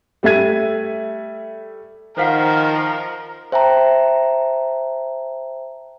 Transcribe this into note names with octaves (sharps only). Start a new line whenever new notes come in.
G3 A3 E5 G#6 D#7
D#3 F3 A#4 C5 F5 F#5
C5 E5 G5 A5 A#5